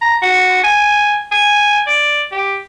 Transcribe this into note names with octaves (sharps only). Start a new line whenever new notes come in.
A#5
F#4
G#5
G#5
D5
G4